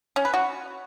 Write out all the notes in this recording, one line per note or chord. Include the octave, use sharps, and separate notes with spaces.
C#4
B4
F#4